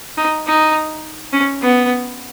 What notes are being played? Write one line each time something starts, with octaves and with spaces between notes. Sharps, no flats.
D#4
D#4
C#4
B3